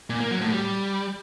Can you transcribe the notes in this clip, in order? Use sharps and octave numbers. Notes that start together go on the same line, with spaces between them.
A#2
A#3
F#3
A2
G3